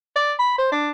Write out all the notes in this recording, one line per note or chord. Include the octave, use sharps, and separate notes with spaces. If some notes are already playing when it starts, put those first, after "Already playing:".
D5
B5
C5
D4